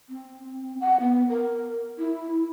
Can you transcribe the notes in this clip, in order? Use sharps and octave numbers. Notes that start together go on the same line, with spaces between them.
C4
F#5
B3
A#4
E4